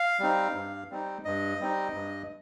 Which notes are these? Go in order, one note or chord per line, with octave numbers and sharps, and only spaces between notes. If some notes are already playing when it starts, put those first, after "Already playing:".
Already playing: F5
G3 C4 D#4
G2
G3 C4 D#4
G2 D#5
G3 C4 D#4
G2